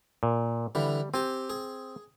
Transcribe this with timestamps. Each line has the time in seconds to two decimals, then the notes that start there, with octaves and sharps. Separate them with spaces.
0.23 A#2
0.75 D3 E3 G3
1.14 C4 G4 G#5
1.50 G#4